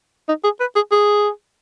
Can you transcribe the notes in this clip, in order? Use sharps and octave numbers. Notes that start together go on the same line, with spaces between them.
D#4
G#4
B4
G#4
G#4